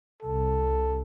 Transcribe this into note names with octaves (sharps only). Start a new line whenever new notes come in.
C2 A4